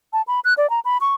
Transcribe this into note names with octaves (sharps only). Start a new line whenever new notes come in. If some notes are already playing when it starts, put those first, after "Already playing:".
A5
B5
F#6
D5
A#5
B5
C#6